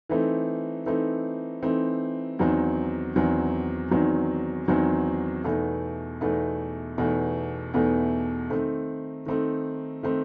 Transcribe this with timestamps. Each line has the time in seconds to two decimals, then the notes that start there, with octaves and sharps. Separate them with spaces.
0.09 E3 A3 C4 D#4
0.86 E3 A3 C4 D#4
1.62 E3 A3 C4 D#4
2.39 E2 D#3 F#3 C4 D#4
3.16 E2 D#3 F#3 C4 D#4
3.91 E2 D#3 F#3 C4 D#4
4.68 E2 D#3 F#3 C4 D#4
5.44 E2 B2 A3 D#4
6.21 E2 B2 A3 D#4
6.98 E2 B2 A3 D#4
7.74 E2 B2 A3 D#4
8.50 D#3 A3 C4 D#4
9.26 D#3 A3 C4 D#4
10.03 D#3 A3 C4 D#4